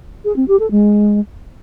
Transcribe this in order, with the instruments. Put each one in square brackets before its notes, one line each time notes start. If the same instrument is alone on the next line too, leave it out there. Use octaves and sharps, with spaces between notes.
[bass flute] G#4
C4
G4
A4
G#3